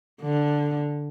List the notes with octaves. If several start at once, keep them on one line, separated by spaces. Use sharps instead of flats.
D3